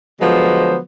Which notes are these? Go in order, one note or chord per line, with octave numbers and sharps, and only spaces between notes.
D3 F3 F#3 G#3 B3 C5